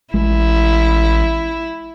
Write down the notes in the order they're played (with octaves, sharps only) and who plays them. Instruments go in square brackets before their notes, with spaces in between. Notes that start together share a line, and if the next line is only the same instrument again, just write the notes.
[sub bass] A1 [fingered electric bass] G#3 [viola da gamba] E4